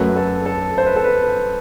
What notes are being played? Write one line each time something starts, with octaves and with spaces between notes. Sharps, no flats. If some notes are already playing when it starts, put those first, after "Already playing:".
Already playing: F#2 F#3 A3 B4
A4
A4
C5
B4
A4
B4